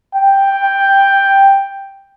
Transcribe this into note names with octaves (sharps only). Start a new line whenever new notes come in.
G5